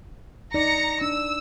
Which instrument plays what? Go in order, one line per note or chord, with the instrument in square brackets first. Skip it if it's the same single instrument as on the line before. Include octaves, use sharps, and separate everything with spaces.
[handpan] D#4 D5 [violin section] A#5 A#6 C#7
[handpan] D4 [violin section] E6